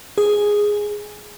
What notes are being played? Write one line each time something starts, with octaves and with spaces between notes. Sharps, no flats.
G#4